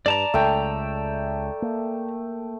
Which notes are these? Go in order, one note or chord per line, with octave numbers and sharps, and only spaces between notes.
G2 D5 A5 A#5
C#2 A3 G5
A#3